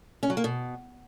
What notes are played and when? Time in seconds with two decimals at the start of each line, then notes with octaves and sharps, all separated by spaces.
0.23 C#4
0.30 F#3
0.37 A#3
0.44 B2